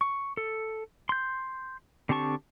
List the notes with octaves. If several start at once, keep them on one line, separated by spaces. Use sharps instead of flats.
C#6
A4
C6 G6
D3 C4 G4 A5 C#6